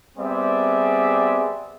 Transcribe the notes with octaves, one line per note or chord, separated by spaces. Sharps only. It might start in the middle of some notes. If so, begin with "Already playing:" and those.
G3 B3 C4 G#4 D5 E5